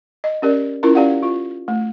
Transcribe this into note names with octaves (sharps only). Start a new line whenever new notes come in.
D#5
C#4 G4 A#4 D5
C#4 E4 F4 A#4 A#5
C#4 G4 D5 F5 F#5
F4
A3